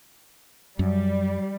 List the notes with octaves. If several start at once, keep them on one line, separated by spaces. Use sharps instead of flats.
F#2 G3